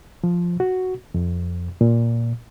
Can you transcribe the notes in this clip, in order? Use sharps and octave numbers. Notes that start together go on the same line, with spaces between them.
F3
F#4
F2
A#2